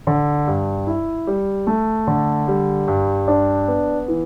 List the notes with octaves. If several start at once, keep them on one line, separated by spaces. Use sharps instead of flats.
D3
G2
E4
G3
A3
D3
G3
G2
D4
B3
E3